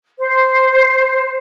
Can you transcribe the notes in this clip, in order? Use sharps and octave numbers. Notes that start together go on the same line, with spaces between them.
C5